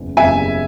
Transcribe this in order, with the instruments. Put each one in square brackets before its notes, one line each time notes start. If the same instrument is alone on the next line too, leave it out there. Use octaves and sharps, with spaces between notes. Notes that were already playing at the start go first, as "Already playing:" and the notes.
Already playing: [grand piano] F#1 E2 C#3
[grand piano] F#1 E2 C#3 [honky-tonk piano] E5 G#5